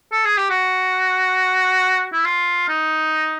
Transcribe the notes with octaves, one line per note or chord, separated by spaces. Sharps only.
A4
G#4
G4
F#4
E4
F4
D#4